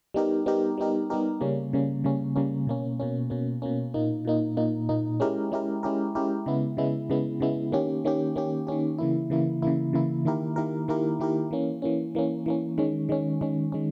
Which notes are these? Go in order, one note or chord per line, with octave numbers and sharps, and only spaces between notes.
G3 B3 D#4 G4 A#4
G3 B3 D#4 G4 A#4
G3 B3 D#4 G4 A#4
G3 B3 D#4 G4 A#4
C#3 G3 A#3 C#4
C#3 G3 A#3 C#4
C#3 G3 A#3 C#4
C#3 G3 A#3 C#4
B2 A#3 C#4
B2 A#3 C#4
B2 A#3 C#4
B2 A#3 C#4
A#2 A#3 D#4
A#2 A#3 D#4
A#2 A#3 D#4
A#2 A#3 D#4
G#3 C#4 E4 G4 A#4
G#3 C#4 E4 G4 A#4
G#3 C#4 E4 G4 A#4
G#3 C#4 E4 G4 A#4
C#3 G#3 B3 E4
C#3 G#3 B3 E4
C#3 G#3 B3 E4
C#3 G#3 B3 E4
D#3 A#3 C#4 G4
D#3 A#3 C#4 G4
D#3 A#3 C#4 G4
D#3 A#3 C#4 G4
C#3 E3 A#3 E4
C#3 E3 A#3 E4
C#3 E3 A#3 E4
C#3 E3 A#3 E4
D#3 A#3 E4 G4 A#4
D#3 A#3 E4 G4 A#4
D#3 A#3 E4 G4 A#4
D#3 A#3 E4 G4 A#4
E3 A#3 C#4
E3 A#3 C#4
E3 A#3 C#4
E3 A#3 C#4
D#3 G#3 C#4
D#3 G#3 C#4
D#3 G#3 C#4
D#3 G#3 C#4